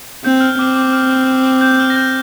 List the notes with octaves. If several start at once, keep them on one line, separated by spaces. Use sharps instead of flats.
C4 G6
F6
C4 D6
D6
F6
G6
F6
A#6
G6